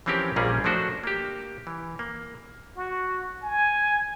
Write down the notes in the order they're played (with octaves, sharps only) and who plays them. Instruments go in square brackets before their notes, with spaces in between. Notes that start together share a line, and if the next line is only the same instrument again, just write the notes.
[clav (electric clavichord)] E3 F3 C4 C#4 G4 A#4
A#1 A#2 G3 A#3 C#4 G#4
F3 A3 D4 F#4 C5
A#3 G4
E3
A#3
[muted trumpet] F#4
G#5